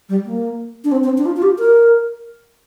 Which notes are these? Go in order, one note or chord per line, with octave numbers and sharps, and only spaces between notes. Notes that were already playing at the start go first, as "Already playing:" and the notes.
G3
A#3
D4
C4
C4
D4
F4
F4
G4
A#4